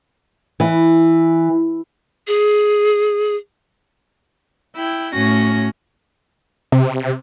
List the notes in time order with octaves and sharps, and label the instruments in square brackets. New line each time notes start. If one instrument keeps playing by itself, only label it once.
[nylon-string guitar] E3
[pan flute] G#4
[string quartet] E4 G5
A2 C#4 F#4 A#6
[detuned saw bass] C3